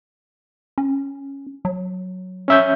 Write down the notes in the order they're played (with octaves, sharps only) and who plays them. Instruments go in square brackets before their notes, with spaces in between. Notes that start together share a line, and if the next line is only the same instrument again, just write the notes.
[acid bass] C#4
F#3
[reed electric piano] C#4 E5 G6